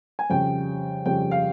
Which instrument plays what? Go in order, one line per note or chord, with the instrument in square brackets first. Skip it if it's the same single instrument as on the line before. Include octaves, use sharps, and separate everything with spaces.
[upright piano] G#5
F2 C#3 G3 G5
F2 C#3 G3 G5
F5